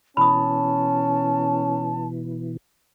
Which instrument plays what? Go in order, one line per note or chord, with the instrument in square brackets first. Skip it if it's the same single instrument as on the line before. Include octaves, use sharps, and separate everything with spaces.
[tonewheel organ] B2 E3 [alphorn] C#4 [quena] A5 [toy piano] B5 D#6